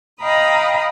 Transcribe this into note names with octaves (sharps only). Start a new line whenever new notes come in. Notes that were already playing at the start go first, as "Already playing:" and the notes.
D#5 F5 G5 A#5 B5 D#6